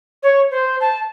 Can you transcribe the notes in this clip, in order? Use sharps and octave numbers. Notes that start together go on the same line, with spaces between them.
C#5
C5
A5